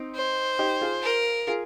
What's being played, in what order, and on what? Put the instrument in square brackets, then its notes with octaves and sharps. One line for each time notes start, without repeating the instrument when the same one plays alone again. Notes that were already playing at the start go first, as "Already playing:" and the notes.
Already playing: [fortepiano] C4 D#4
[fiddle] C5
[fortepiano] D#4 G4
F4 G#4
[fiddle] A#4
[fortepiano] F4 G#4